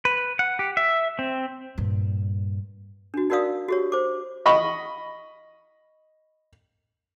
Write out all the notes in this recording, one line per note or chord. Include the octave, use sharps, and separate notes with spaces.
B4
F#5
G4
E5
C4
G2 A#2
D4 F#4
D#4 F#4 A#4 D5 F5 D#6
F#4 G4 C#5
C5 D6
D#5 B5 C#6